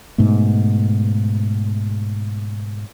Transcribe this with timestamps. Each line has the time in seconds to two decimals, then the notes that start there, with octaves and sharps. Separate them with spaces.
0.18 G#2 B2 A3